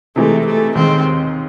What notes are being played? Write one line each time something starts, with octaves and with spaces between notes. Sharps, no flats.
C3 E3 G#3 A3
A3
D#2 D#3 G#3 C4